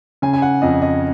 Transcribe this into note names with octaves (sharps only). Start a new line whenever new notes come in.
C#3 G#5
G#5
F#5
F2 D#5
D#5